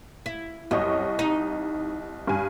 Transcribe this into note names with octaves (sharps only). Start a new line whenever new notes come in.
E4
C2 F#2 D#5 C#6
D#4
G2 G#5